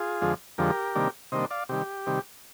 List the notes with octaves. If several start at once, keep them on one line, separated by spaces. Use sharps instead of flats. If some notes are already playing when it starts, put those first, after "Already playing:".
Already playing: F4 G#4
F2 D3 F3 G#3
F2 D3 F3 G#3 G4 A#4
C3 D#3 G3 A#3 D4
C3 D#3 G3 A#3 D4 C5 D#5
D5 F5
C3 D#3 G3 G4
C3 D#3 G3